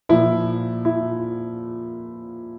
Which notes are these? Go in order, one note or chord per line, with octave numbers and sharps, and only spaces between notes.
A#2 F3 E4
E4